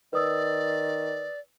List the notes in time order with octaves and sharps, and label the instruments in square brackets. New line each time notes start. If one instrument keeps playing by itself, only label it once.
[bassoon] D#3 [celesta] B4 D#6 E6 [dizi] D5